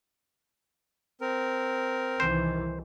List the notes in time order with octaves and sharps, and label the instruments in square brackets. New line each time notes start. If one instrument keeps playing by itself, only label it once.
[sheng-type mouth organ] C4 A#4
[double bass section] C2 D#3 E3 [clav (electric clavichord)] C5